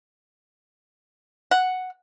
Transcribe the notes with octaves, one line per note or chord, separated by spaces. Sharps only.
F#5